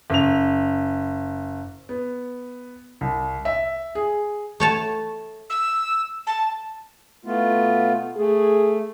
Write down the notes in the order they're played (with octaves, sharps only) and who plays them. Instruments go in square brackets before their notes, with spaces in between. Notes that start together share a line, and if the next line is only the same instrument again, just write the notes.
[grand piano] F#1 F7
[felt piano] B3
C2
E5
G#4
[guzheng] A3 C#5 A5
[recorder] E6
A5
[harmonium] A3 B3 F4 [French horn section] E4
[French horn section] B2
[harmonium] A3 [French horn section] G#4